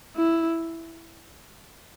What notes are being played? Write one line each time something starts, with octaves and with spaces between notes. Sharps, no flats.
E4